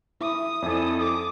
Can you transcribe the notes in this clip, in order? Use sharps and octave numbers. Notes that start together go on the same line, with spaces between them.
E4 D#6
F2 E4 A4 D5 E5 G#5
D6 D#6